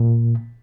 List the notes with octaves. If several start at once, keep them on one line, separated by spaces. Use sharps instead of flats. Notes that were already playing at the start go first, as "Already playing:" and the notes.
Already playing: A#2